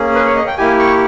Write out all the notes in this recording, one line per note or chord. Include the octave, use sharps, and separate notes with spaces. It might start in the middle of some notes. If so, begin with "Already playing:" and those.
Already playing: A#3 C#4 G#4
B4
C#5
D#5
G5
A#3 E4 G4 G#5
C#6